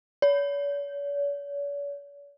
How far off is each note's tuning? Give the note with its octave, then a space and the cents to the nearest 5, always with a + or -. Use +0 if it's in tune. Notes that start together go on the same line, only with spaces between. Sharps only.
C#5 +45